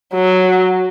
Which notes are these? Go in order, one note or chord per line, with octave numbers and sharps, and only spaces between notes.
F#3